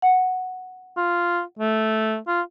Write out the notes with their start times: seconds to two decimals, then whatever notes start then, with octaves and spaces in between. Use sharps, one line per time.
0.02 F#5
0.97 F4
1.59 A3
2.28 F4